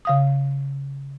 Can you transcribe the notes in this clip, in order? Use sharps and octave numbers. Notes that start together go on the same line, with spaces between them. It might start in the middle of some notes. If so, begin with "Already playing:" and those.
C#3 F5 D#6